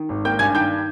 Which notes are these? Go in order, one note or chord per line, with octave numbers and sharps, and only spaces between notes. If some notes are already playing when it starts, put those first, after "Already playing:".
Already playing: D#3
G#1
A#3 G5 G6
G2 G#5 G#6
D#3 G5 G6